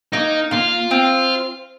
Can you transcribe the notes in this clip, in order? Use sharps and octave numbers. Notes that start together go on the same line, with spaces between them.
A#3 D#4
A#3 F4
C4